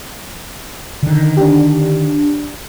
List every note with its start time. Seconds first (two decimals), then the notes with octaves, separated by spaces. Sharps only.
1.03 D3 D#3
1.37 D4 G4